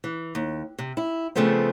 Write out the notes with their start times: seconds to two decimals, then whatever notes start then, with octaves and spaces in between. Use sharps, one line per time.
0.04 E3
0.35 D#2
0.79 C3
0.97 E4
1.35 C#3 F3 A3 B3 C4